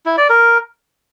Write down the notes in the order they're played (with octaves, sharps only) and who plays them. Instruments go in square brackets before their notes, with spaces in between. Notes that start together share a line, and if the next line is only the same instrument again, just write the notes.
[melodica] E4
D5
A#4